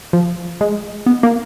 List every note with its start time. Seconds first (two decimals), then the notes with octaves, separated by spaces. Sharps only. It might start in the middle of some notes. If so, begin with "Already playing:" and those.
0.13 F3
0.61 G#3
1.06 B3
1.23 A#3